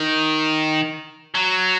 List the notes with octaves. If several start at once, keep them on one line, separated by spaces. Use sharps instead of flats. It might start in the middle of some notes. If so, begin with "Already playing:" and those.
Already playing: D#3
F#3